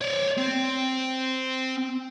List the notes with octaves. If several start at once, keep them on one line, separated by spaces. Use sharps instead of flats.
C#5 D5
C4